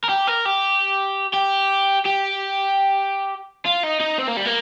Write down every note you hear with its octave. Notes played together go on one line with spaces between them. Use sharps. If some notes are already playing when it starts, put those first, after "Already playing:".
A#4
G4
A#4
G4
G4
G4
F4
D#4
D#4
C4
A#3
G3
A#3